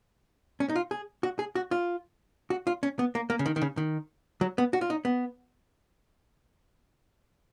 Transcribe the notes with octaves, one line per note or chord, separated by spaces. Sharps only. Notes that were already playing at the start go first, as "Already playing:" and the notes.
C#4
D#4
F4
G#4
F#4
G#4
F#4
F4
F#4
F4
C#4
B3
A#3
A#3
C#3
D#3
D#3
C#3
D#3
F#3
B3
F#4
F4
D#4
B3